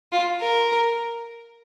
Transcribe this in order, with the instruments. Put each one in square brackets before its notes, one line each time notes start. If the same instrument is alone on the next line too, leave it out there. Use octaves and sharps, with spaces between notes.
[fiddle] F4
A#4